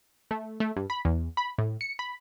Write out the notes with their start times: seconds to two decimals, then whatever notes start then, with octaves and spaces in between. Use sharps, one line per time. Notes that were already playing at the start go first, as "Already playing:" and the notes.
0.31 A3
0.60 A3
0.76 G2
0.90 B5
1.05 E2
1.37 B5
1.58 A2
1.81 C#7
1.99 B5